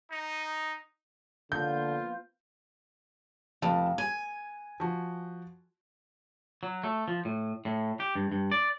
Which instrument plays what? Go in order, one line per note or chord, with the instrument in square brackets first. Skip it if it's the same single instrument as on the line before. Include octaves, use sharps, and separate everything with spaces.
[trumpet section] D#4
[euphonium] D3 [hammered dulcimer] F3 A#3 B3 [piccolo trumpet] F4 [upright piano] G6
[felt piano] F1 A5 [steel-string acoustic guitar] F2
[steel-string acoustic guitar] G#5 [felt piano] G#6
[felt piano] F3 F#4
[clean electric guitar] F#3
A3
F3
A2
A2
G4
G2
G2
D5